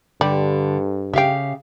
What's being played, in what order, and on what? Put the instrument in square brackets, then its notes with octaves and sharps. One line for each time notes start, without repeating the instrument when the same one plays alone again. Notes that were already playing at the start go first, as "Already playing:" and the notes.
[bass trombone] G2 [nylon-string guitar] D3 [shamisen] G3
[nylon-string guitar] C#3 G4 F5 [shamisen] E5 G5